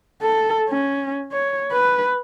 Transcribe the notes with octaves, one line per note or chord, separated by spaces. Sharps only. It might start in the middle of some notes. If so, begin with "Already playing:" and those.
A4
C#4
C#5
B4